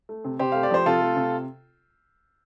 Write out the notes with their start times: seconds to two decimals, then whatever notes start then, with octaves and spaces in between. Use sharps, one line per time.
0.09 A3
0.24 C3
0.39 C3 G4 C5
0.52 A3 F5
0.63 D5
0.71 F3 C5
0.86 C3 F4 A4
1.01 A3
1.16 C3